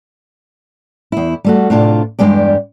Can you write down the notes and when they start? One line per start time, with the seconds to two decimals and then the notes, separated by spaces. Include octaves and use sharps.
1.12 E2 E4
1.44 G3 A3 F#4
1.70 A2 C3 D4 F4
2.19 E2 G2 C#3 G#3 G4 D5